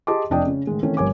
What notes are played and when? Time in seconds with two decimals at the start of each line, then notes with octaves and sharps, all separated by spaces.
0.07 G4 G#4 D#5 A5 C6 D6
0.30 F1 F2 D4 D#5 G5 D#6
0.46 C#3 C#4
0.67 A2 D#3 G#3
0.83 D#3 E3 A3 C4 C#4
0.97 G1 G2 A#4 C#5 G#5 D6